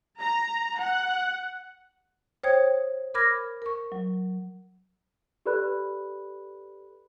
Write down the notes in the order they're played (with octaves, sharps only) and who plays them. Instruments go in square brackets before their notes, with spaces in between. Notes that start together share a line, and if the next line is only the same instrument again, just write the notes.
[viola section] A#5
F#5
[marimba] C5 C#5 G5 D#6 G#6
A#4 B5 D6 F6 G#6 A#6
A#4 C#6
F#3
[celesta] G4 A4 B4 D5 B5 F#6